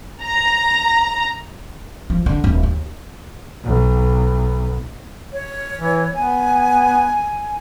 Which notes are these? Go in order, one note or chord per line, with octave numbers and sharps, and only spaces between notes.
A#5
F3
D3
D1
D#2
B1
C#5
E3
B3 G#5